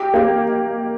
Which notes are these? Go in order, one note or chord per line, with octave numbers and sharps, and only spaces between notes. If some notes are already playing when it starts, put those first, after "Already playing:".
Already playing: G4
A#3